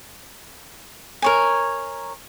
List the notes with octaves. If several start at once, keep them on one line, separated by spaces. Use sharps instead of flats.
A#4 C#5 G#5